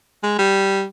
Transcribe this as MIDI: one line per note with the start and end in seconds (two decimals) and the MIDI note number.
0.23 0.38 56
0.39 0.83 55